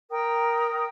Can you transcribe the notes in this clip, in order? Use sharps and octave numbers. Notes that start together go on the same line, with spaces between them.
A#4 G5 D#6